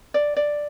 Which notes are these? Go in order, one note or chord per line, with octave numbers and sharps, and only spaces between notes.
D5
D5